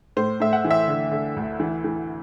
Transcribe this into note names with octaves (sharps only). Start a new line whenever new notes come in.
A2 C5
A2 E5
F#5
E3
E5
D3
D3
D2
E3
E3